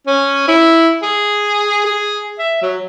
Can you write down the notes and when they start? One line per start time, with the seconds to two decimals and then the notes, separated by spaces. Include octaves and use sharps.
0.07 C#4
0.48 E4
1.02 G#4
1.86 G#4
2.39 E5
2.62 F#3